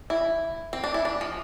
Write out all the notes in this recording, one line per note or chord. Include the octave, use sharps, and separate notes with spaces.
E4
C4
D4
E4
D4
F3